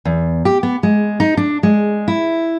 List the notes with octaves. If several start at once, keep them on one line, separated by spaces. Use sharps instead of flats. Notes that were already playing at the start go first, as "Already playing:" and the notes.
E2
G4
B3
G#3
D#4
D4
G#3
E4